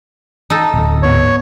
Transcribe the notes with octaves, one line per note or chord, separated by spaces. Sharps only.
D#4 A4
D1
G#2 B3 C#5